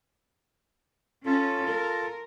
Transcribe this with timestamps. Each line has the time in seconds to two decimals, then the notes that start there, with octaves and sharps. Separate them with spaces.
1.26 C#4 F4 A4
1.69 A#4